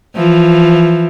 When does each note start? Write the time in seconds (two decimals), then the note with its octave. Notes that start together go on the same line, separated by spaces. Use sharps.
0.15 E3 F3